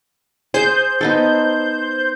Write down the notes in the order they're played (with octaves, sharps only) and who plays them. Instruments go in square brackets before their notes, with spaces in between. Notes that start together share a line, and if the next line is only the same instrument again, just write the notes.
[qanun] G#4 [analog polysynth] C5 G6
[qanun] B3 D#4 A4